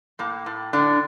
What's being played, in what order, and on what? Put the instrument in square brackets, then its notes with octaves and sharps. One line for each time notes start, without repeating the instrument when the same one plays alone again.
[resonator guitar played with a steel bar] A2 A#3
A2
A2 D3 D4